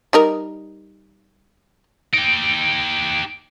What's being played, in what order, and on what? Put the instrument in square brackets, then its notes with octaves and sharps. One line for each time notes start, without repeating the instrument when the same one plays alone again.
[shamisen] G3 D#4 A#4
[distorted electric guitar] D#4 G4 [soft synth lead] D7